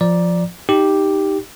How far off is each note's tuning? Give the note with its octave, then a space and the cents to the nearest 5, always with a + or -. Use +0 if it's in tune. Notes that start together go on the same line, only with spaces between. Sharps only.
F3 +0 D5 +0 A#5 +15
D#4 +0 G4 +0